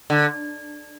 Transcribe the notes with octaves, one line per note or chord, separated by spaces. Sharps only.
D3